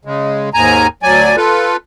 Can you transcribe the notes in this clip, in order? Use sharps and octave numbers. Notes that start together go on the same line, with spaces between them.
C#3 G#3
D#2 G#2 G#5 A#5
D2 F#3 D5 G#5
F4 A4 B4